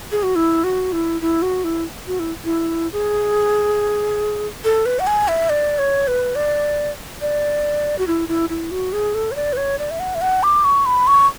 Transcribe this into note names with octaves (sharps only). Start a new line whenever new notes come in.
G#4
F#4
E4
F#4
E4
E4
F#4
E4
F#4
E4
E4
G#4
A4
B4
F#5
G#5
E5
D5
C#5
B4
D5
D5
F#4
E4
E4
E4
F#4
G#4
A4
C#5
D5
B4
C#5
D5
E5
F#5
E5
F#5
D6
C#6
B5
C#6